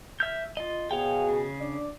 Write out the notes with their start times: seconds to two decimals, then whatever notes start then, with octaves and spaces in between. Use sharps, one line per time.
0.20 E5 F6 G6
0.57 F4 D#5
0.91 B2 F#4 G#4 C#5 F5 G5
1.29 C#3
1.59 D4 D5